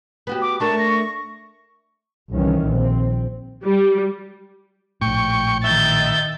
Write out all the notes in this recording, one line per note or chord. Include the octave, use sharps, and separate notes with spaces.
B3 F#4 G4
D6
A3 D4 A#4 A5 C#6
A#6
C2 D#3 E3 C#4
A#1 C4
G3
A#1 A2 G5 C#6
D#3 E5 G6 A6